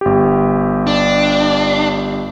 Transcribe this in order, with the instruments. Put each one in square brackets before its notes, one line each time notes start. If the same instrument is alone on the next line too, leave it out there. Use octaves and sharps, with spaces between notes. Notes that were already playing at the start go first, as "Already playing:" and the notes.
[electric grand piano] G1 G4
[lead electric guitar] D4